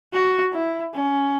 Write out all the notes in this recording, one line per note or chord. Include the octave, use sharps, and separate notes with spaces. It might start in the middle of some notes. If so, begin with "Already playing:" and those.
F#4
E4
C#4